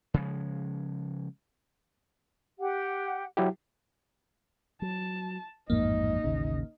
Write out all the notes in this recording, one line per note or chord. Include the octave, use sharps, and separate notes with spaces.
C#3 F3 G#3
G4 F#5
F#3 E4 G4
F#3 A5
A1 F2 G#2 A#3 D#4 D#5
A1 D#2 C#3